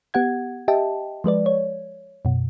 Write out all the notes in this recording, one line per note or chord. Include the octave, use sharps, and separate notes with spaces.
B3 G4 F#5 G#6
G4 D#5 E5 G5 A5
F3 G#3 B4 D5
C#5
F#2 B2